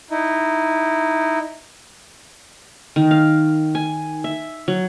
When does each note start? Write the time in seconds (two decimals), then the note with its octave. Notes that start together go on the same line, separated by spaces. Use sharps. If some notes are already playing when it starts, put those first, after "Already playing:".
0.11 D#4 E4
2.96 D#3
3.11 F5
3.75 G#5
4.24 E5
4.68 F#3